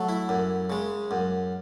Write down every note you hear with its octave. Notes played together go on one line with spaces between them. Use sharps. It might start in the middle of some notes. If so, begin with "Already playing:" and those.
Already playing: F#3 A3
E4
F#2
C#3 G#3
F#2